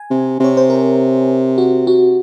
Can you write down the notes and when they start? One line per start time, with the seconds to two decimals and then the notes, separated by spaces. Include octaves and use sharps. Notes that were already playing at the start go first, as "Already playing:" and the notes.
Already playing: G#5
0.10 C3
0.40 C3 C#5
0.57 C5
0.70 A#4
1.58 F#4
1.87 F#4